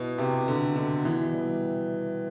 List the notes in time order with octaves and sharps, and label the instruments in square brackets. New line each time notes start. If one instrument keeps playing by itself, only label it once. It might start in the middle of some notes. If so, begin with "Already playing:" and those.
Already playing: [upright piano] B2 [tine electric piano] E4
[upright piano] C3 [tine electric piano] G4
[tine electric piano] B2 [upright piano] D3
[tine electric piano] B2 [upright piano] D3
[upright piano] E3 [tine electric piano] B3
[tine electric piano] G3